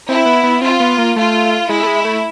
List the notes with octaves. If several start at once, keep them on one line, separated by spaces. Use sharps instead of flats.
C4 E4
B3
B3
C4 F4
B3
A#3
A3 F4
G#3 E4
A3
G#3
A3